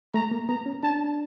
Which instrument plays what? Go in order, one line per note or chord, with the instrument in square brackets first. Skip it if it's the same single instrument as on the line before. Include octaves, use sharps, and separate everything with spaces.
[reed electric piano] A3 [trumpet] A#5
[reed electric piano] A#3
[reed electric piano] B3 [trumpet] A#5
[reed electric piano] C#4
[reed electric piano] D4 [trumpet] A5